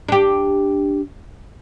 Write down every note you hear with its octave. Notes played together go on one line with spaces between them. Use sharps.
D4 G4